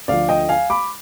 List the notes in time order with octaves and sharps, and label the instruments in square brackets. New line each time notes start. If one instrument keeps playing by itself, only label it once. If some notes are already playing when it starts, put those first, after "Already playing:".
[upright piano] D2 D3 F3 D5 F5
D#5 G5
F5 G#5
B5 D6